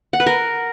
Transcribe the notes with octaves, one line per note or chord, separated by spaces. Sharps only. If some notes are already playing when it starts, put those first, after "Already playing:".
F#5
B4
A#4